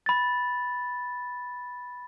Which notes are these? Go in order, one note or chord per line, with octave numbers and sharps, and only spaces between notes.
B5 A6